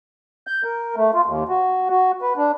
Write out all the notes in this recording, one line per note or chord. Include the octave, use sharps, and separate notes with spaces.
G6
A#4
A3
F4
D#2
F#4
F#4
B4
D4